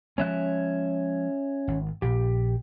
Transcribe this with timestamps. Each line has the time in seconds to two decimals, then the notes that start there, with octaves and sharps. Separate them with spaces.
0.18 F3 G#3 C#4 E5 F#6
1.68 G#1
2.02 A#1 G4